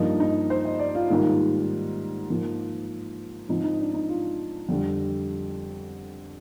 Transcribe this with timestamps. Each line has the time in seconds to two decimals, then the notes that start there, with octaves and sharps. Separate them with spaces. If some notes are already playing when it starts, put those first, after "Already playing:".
Already playing: G2 F3 A#3 D#4
0.20 D#4
0.50 C5
0.65 D#5
0.79 D5
0.95 F4
1.09 G#2 D#3 G3 A#3 F4
2.29 G#2 F3 A#3
3.48 G#2 F3 C4 D#4
3.64 D#4
3.80 D4
3.94 D#4
4.09 F4
4.69 F2 D3 G3